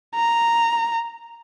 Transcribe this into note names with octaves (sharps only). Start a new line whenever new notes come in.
A#5